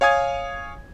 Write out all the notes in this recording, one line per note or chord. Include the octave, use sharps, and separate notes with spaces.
C#5 F5 G#5 D#6 G#6